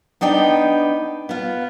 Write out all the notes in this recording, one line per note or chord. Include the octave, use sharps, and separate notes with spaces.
B3 D4 D#4 G5
B3 F4